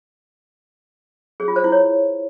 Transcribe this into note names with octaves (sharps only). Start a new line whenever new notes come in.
G#4
F4
C5
E4
C#5